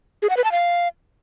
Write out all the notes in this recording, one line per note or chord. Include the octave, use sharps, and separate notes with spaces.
G#4
F#5
B4
A5
F5